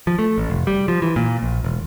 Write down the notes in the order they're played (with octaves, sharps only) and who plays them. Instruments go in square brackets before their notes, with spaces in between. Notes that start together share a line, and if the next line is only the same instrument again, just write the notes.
[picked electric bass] F3
A3
A1
F1
G3
F3
E3
A#2
A#1
E1